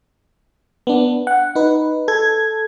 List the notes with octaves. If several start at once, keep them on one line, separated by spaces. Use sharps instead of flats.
B3 D4
F#5
D#4 B4
A4 G#6